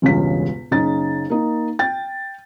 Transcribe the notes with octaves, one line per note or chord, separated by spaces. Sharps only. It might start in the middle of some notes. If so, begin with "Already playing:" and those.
E1 C#2 G2 C#3 B6
F#1 C#3 D#4 A6
A#3 D#4
G5 A6